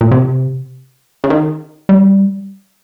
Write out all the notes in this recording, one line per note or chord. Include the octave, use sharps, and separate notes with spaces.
A#2
C3
C#3
D#3
G3